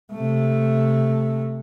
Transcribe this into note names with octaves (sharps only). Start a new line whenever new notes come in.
C3 A3